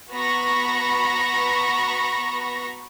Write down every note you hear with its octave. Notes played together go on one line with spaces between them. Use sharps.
B3 F#4 A#5 B5 C#6 A#6